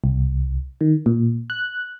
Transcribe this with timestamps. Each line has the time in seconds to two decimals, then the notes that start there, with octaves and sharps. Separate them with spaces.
0.04 C2
0.81 D#3
1.06 A#2
1.50 F#6